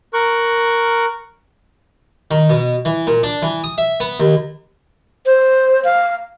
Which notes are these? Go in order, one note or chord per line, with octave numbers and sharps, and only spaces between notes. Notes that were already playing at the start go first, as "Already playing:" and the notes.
A#4 C#6 F#6
D#3
B2
E3
A#2
D4
E3
D#6
E5
B3
D#2
C5
F5